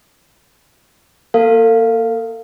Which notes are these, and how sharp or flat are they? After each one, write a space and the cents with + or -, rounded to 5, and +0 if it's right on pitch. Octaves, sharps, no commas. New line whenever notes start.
A#3 +5 A4 +40 F5 +0